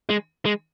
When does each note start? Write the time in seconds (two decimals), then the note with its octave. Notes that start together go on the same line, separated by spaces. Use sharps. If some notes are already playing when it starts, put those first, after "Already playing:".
0.10 G#3
0.46 G#3